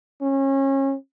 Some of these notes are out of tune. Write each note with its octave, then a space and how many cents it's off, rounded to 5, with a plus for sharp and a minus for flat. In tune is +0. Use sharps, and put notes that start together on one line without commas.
C#4 -30